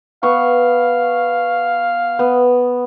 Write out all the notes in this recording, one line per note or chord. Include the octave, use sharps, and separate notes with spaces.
B3 F5 F#5 C#6
B3